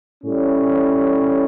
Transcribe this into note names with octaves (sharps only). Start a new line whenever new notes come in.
A2 G3 C#4